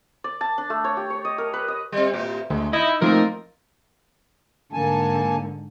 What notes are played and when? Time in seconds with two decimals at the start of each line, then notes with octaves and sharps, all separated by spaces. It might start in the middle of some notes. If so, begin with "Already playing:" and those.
0.24 D5
0.41 A5
0.58 D4
0.70 A3
0.84 C#5
0.97 G4
1.10 C#5
1.25 D#5
1.38 A#4
1.53 B4
1.68 D#5
1.92 G3 C4
2.14 A2 G4
2.50 D2 G#3
2.73 D#4 E4 D#5
3.02 F3 A3 A#3 C4 D#4 F4 A#4
4.73 G#2 D3 A#3 G#5 A5